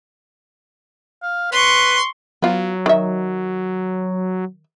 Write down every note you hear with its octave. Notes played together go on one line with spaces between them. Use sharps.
F5
B4 C6 C#6
F#3 B3 F4
D#3 E5